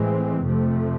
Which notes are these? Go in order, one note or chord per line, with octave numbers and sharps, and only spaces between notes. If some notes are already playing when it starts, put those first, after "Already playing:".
Already playing: A2 E3 G#3 C4
F2 C3 F3 A3